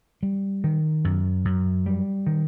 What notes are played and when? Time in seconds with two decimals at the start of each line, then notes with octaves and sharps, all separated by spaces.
0.23 G3
0.64 D#3
1.04 F#2
1.45 F#2
1.86 G3
2.27 D#3